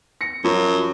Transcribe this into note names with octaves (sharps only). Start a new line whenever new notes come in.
A#6 C#7
F#2 F3 F#3